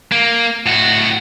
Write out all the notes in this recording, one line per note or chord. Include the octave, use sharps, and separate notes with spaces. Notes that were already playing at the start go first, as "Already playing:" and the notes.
A#3
A2 F#4